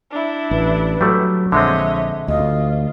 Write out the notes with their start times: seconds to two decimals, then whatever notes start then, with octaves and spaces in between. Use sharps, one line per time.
0.11 D4 E4
0.51 A1 B4
1.01 F#3 G3 A3
1.52 A#1 D3 G#3 C4 C#5 D#5 E5
2.28 D2 F4 D#5